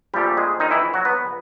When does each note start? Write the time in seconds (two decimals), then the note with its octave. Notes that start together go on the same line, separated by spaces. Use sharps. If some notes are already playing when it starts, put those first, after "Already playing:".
0.14 A#1 A#2 F3 G3 A3 G4
0.37 G#3 G#4
0.60 D#3 D#4
0.71 E3 E4
0.94 F#3 F#4
1.05 B3 B4